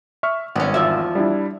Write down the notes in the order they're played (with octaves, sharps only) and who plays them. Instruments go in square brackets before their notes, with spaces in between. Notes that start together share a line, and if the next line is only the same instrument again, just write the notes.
[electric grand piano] E5 C#6 F6
[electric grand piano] G#1 [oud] B3 C#4
[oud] E2 F3 E5
[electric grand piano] G3 D4 E4